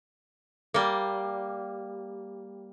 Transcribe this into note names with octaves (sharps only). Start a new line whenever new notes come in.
G3 A#3